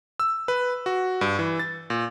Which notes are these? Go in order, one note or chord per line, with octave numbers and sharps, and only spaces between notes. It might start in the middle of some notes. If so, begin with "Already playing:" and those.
E6
B4
F#4
G2
E3
A6
A#2